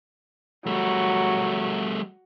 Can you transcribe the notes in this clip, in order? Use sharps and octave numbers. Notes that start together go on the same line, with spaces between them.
F#3 G3 A3